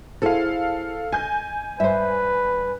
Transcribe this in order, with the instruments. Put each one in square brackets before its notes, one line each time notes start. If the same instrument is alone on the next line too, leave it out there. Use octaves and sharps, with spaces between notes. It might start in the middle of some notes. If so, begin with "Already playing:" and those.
[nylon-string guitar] E4 G#4 C5 [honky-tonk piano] A4 F5
[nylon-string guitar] D#5 [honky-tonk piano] G#5 G6
[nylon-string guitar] G2 [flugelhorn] B4 [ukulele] C5 E5